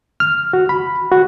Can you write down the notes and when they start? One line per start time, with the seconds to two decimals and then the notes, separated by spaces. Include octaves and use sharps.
0.20 F6
0.53 F#4
0.69 B5
1.12 F#4